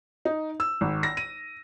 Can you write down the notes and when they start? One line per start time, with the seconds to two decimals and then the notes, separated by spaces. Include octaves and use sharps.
0.25 D#4
0.60 E6
0.81 G#1
1.03 A#6
1.17 D#7